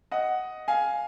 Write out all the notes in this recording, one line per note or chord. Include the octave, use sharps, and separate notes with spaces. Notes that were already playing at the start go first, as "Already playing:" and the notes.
D#5 F#5
F5 G#5